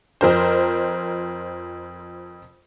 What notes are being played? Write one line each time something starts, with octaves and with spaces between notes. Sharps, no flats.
F2 A#4 C5